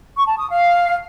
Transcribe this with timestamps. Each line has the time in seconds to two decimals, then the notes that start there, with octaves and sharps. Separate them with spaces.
0.17 C#6
0.27 A5
0.38 D#6
0.49 F5